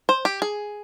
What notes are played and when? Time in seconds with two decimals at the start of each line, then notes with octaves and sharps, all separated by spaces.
0.09 C5
0.25 G4
0.42 G#4